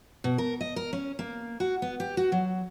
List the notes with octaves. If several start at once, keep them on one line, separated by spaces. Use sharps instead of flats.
B2
A#4
D#5
A#4
C#4
A#3
F#4
B3
G4
F#4
F#3